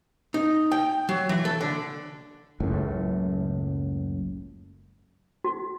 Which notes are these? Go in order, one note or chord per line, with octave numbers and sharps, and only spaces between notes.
D#4
G5
F#3
E3
A4
D3
F#1 C#2 F#2 A2
F#4